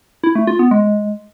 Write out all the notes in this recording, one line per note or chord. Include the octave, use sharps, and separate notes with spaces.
E4
A3
F4
B3
G#3